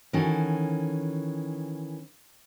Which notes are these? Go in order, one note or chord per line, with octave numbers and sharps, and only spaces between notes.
D#3 E3 C#4 F#4 A4